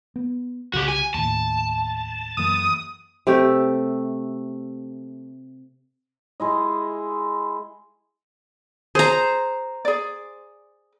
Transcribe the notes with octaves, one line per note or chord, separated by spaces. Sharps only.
B3
C2 C#3 F#4 G4
G#5
D#2 A2 A5
F#2 E3 A#3 D#6
C3 A3 G4
G#3 E4 D#5
G#4 C5 A#5
G#4 D5